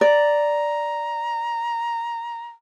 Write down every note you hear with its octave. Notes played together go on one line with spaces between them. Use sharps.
D5 A#5